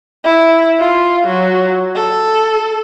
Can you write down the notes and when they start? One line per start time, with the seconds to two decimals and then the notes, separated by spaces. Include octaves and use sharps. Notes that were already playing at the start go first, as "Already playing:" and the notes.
0.24 E4
0.79 F4
1.26 F#3
1.95 A4